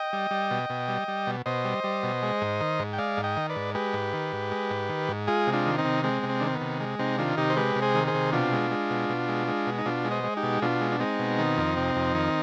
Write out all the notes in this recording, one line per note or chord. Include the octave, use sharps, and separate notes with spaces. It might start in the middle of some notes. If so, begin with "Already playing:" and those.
Already playing: D#5 G5
G3
G3
B2
B2
G3
G3
B2
B2 C5 D#5
G3
G3
B2
G#3
G#2
D#3
G#2
G5
G#3 D5 F5
G#2
D#5 G5
D#3
B4 D5
G#2
G#3 G4 B4
G#2
D#3
G#2
G#3
G#2
D#3
G#2
G#3 F4 G#4
C3
D4 F4
D#3
C4 D#4
C3
G#3 C4
C3
C4
D#3 D4
C4
B3
C3
G#3
C3 C4 D#4
D#3 D4 F4
C3 D#4 G4
C5
G#3 G4 B4
C3
G#4 C5
D#3
G#4 C5
C3
B2 D4 F4
G#3
G#3
B2
B2
G#3
G#3
B2
D#4
B2 D4 F4
G#3
C5 D#5
G#3
D#4 G4
B2
B2 D4 F4
G#3
D4
G#3 C4 D#4
B2
D#3
F2
C3
F2
D#3